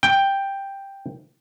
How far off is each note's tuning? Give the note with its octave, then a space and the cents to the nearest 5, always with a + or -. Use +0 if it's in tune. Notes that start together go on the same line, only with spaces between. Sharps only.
G5 +5